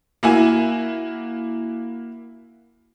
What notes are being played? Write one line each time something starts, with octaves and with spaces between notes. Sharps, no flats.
A#3 E4 F#4 G#5